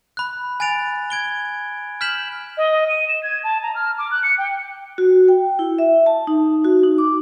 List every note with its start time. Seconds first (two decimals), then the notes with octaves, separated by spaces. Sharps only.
0.17 B5 F#6
0.60 G#5 F#6 A6 D7 F7
1.10 G#6 D7 G7
2.01 F6 G6 B6 E7 F#7
2.57 D#5
2.88 D#7
3.08 E7
3.23 G#6
3.44 A5
3.63 A#5
3.75 F6
3.98 D6
4.11 F#6
4.23 C#7
4.38 G5
4.98 F#4
5.28 G5
5.59 E4
5.79 E5
6.06 A5
6.27 D#4
6.64 F#4
6.83 D#4
6.98 D6